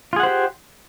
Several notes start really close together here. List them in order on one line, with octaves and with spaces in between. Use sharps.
F4 G#4 F#5 C5 G4